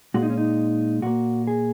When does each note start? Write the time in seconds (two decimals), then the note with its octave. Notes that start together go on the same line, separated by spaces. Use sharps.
0.14 A#2 G#3 F#4
0.23 D#4
0.30 C#4
0.38 D#4
1.02 A#2 A#3 F#4
1.47 G#4